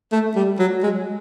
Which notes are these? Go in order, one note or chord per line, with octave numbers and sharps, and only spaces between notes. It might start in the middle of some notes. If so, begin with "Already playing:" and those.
A3
G3
F#3
G#3